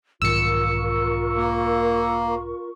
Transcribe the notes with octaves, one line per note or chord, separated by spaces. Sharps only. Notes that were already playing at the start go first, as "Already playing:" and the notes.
B1 G#2 D#3 F4 A#4 C#6 E6 C#7
A#3